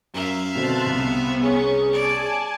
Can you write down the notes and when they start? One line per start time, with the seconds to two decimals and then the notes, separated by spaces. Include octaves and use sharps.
0.14 F#2 A#4 E5 F5 F#7
0.55 B2 D3 C4 A5 C6 F#6
0.86 C2 B3 C4
1.41 C#4 G#4
1.93 D5 G#5 A5